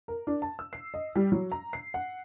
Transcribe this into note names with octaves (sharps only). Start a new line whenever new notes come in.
A#4
D4
A5
E6
C7
D#5
G3
F#3
A#5
C7
F#5